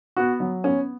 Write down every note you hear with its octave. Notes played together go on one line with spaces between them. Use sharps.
B3 F#4
F#3
B3 C#4